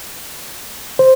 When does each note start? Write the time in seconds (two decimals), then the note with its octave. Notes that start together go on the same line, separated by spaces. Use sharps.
0.99 C5